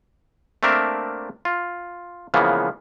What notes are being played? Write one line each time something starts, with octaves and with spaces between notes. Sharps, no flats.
A3 A#3 C4 D4 A#4 E5
F4
C#3 E3 F3 G#3 A#3 B3